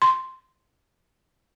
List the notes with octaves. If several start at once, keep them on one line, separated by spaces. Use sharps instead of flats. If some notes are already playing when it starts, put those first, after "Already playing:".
C6